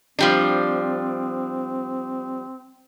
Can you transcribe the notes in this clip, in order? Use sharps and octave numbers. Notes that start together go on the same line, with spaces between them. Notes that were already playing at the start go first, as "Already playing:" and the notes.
F3 G3 C4 D4